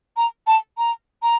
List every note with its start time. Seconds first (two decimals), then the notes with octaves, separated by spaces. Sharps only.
0.17 A#5
0.47 A5
0.78 A#5
1.23 A#5